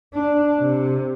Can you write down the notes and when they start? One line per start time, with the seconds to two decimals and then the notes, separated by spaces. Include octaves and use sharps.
0.14 D4
0.60 C3